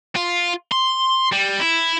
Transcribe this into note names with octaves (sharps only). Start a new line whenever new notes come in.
F4
C6
G3
E4